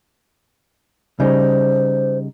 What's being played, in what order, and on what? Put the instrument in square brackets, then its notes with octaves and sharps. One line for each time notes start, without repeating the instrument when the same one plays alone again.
[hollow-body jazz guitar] C#3 G3 D#4 [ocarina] C5